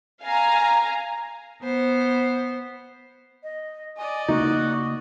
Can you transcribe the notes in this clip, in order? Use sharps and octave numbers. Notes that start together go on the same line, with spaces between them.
F5 G#5 A#5
B3 C5
D#5
D5 D#5 G#5
C#3 A#3 D#4 F#4